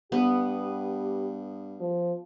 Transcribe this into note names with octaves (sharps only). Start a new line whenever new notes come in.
G2 B3 G4
F3